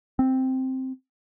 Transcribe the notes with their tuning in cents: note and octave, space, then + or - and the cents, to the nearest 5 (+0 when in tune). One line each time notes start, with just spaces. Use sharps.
C4 +0